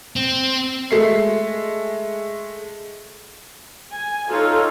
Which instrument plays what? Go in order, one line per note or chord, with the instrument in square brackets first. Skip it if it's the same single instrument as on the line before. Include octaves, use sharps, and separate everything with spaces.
[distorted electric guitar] C4
[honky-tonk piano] G#3 A3 C7
[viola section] G#5
D#4 F4 A4 C#5